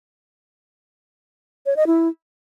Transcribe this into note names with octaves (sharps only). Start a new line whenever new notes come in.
C#5
D#5
E4